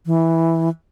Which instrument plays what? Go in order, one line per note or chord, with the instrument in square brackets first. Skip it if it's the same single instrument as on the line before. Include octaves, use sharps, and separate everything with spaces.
[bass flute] E3